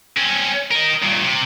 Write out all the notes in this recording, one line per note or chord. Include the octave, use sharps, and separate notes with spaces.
C4 C#4
A#4 D#5
G2 A#2
C3